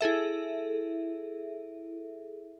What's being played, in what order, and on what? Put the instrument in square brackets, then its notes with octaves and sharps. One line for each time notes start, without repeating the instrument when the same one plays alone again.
[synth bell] E4 G#4 A4 E5